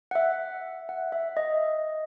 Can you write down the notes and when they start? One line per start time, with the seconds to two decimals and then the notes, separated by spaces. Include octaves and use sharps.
0.11 F#5
0.15 E5
0.89 F#5
1.12 E5
1.37 D#5